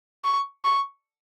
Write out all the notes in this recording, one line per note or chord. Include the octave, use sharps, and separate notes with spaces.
C#6
C#6